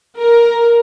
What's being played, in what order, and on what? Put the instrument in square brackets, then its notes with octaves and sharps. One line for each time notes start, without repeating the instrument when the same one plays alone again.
[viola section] A#4